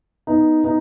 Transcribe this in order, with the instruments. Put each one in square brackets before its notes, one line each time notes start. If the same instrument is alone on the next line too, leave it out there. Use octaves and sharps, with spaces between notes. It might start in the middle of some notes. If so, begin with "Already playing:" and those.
[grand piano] B3 D#4
B3 D#4